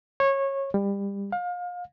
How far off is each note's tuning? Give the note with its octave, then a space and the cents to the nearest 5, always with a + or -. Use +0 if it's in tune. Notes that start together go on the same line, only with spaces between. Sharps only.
C#5 -20
G3 +25
F5 +30